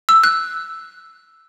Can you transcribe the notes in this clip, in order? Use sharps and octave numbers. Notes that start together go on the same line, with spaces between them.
E6
F#6